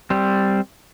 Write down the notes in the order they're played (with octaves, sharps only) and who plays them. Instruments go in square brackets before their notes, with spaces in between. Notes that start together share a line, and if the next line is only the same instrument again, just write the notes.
[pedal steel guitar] G3 C4